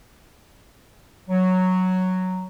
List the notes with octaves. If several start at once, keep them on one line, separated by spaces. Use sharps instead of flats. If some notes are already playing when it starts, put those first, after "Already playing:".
F#3